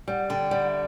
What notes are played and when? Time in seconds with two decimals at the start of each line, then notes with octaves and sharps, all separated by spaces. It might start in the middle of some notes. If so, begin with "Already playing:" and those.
0.07 G3 F#5
0.29 D3 G5
0.51 G3 F#5
0.67 E5